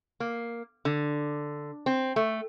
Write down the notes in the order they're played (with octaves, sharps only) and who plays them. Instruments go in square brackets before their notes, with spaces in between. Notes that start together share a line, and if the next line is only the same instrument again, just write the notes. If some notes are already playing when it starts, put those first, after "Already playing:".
[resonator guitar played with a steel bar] A#3
D3
C4
A3